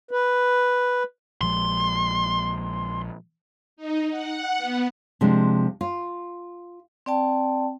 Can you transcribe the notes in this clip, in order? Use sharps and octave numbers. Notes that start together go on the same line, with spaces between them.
B4
A#1 F3 G#3 C6
D#4
F#5
B3
C3 F3 G#3 D4
F4
C4 D5 G5 A5